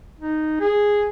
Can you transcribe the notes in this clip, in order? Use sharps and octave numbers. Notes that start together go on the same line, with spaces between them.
D#4
G#4